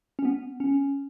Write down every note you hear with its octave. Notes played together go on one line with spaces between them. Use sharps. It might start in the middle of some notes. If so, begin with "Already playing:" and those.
C#4
B3
C#4